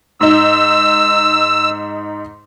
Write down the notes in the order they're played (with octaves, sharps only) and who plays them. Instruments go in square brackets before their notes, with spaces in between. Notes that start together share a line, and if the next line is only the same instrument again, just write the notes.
[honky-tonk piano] G#2 D#4 [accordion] E6